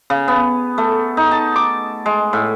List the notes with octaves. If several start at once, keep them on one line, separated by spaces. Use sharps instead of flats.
C#3
B3
A3
D#4
A5
D6
G#3
A2